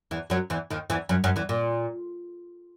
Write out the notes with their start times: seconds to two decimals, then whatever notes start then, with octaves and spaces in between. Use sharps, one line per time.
0.11 E2 E3
0.30 F#2 F#3
0.50 E2 E3
0.70 D#2 D#3
0.90 E2 E3
1.09 F#2 F#3
1.24 F#2 F#3
1.36 E2 E3
1.49 A#2